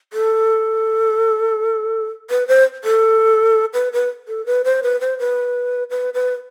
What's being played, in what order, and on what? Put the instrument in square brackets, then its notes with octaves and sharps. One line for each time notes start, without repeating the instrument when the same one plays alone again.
[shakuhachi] A4
B4
C5
A4
B4
B4
A4
B4
C5
B4
C5
B4
B4
B4